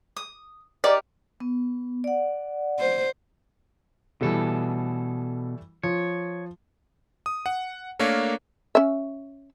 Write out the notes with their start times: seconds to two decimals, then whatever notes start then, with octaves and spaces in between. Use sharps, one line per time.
0.17 D#6
0.84 D#4 G4 A#4 D5
1.40 B3
2.04 D5 F#5
2.79 C5
4.21 B2 E3 G3 A3 A4
5.83 F3 C#5
7.26 D#6
7.46 F#5
7.99 A3 A#3 D4 A#4 C#5 F5
8.75 C#4 E5